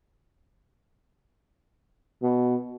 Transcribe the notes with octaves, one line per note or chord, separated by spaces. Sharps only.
B2